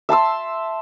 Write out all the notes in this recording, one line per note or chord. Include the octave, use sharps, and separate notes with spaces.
E5 A5 C6 E6